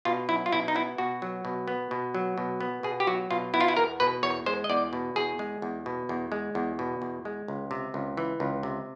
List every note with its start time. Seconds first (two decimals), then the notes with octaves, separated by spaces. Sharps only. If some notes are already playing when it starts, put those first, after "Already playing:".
0.05 B2 F4
0.29 F#3 E4
0.46 F4
0.53 B2 E4
0.68 D#4
0.75 B3 E4
0.98 B2 F#4
1.22 F#3
1.45 B2
1.68 B3
1.91 B2
2.15 F#3
2.38 B2
2.60 B3
2.83 B2 G#4
3.00 G4
3.07 F#3 F#4
3.31 B2 F4
3.54 B3 E4
3.61 F4
3.68 E4
3.77 E2 A#4
4.00 B2 B4
4.23 E2 C#5
4.46 G#3 C5
4.64 D#5
4.70 E2 D5
4.93 B2
5.16 E2 G#4
5.39 G#3
5.62 E2
5.86 B2
6.09 E2
6.32 G#3
6.55 E2
6.79 B2
7.02 E2
7.25 G#3
7.48 C#2
7.71 C3
7.94 C#2
8.17 E3
8.40 C#2
8.63 C3